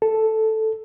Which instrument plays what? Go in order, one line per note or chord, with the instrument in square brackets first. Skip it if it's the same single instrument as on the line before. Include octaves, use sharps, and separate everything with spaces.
[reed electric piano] A4